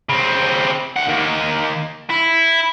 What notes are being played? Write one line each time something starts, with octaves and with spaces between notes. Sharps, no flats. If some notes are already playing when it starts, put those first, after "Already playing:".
C#3 C4
D2 F#5
D#3 A#3
E4